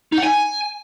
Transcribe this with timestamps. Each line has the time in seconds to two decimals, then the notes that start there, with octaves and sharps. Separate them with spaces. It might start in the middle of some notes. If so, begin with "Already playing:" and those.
0.12 D#4
0.18 F#5
0.23 G#5